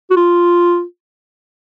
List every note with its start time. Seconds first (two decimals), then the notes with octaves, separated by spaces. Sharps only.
0.11 F#4
0.17 F4